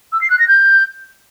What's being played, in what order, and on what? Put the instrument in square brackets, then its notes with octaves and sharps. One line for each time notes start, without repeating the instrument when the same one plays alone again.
[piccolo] E6
C7
F#6
A#6
G6